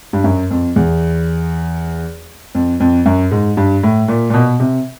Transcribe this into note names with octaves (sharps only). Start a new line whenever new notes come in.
G2
F#2
F2
E2
F2
F2
F#2
G#2
G2
A2
A#2
A#2
B2
C3